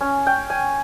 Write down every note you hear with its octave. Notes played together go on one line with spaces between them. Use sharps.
C#4
G5
G#5